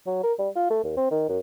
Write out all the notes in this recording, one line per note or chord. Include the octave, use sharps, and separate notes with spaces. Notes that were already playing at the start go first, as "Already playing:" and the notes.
F#3
A#4
G3
F4
A3
D#2
C4
D#3
F#2